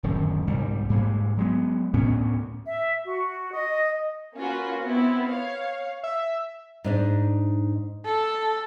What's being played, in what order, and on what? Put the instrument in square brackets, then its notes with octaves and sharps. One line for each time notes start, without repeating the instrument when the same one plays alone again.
[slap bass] D1 F#2 D#3
C2 G#2 G3
G#2 G3 G#3 A#3
F#3 G#3 B3
D2 A2 B3 C#4
[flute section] E5
F#4
D#5
[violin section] A#3 C#4 F4 F#4 B4
B3 C4 E4
C#5 F5
[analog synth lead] E5
[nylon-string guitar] G#2 D4 D#4
[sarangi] A4